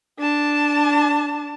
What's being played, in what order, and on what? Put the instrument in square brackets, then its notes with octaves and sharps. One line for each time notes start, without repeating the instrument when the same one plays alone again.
[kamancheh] D4 A5